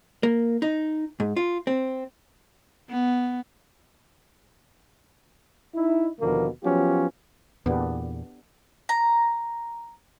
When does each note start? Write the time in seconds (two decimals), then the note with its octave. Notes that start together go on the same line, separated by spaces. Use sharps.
0.23 A#3
0.62 D#4
1.20 G#2
1.36 F4
1.67 C4
2.90 B3
5.75 D#4 E4
6.20 D#2 B2 D3 F3 A#3
6.64 F3 F#3 B3 C#4 F4 G4
7.66 E2 A#2 B3 D4 G4
8.89 A#5